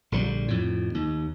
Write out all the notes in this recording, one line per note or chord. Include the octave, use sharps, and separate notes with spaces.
A#1 D3 F3 G3
F2 A2
D#2